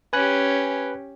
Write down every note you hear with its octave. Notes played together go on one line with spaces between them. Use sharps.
C#4 G4 B4 G#5 F#6